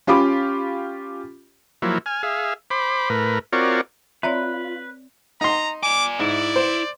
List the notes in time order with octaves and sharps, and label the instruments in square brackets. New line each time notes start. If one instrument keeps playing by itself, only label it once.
[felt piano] C#4 F4 G4 B5 D6
[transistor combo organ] F3 F#3 A#3 E4
G#5 F6
G#4 E5 F5
C5 B5 D6
A2 A#4 B4
C4 F4 F#4 A#4 C#5 D5
[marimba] C4 C#5 D5 [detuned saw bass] F4 [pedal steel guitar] B4 [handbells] E5 A#5 B5
[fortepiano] D#4 C6 [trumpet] A#5
[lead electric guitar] D5 G#5 [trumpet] D6
[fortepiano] G#2 [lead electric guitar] E4 [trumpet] D5
[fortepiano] C5